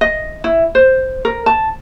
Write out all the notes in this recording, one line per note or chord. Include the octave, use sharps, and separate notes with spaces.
D#5
E4
C5
A#4
A5